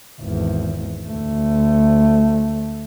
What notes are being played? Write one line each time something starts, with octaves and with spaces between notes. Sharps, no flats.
G#1 E2
D2 A3